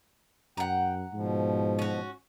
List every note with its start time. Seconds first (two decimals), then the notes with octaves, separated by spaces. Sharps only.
0.57 F#2 F#5 G5 A#5
1.13 G#2 B2 F3
1.79 C#4 F#4